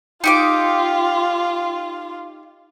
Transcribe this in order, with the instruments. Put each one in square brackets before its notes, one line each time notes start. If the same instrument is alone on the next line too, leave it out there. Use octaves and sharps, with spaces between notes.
[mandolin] D#4 G4 D6 [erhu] F4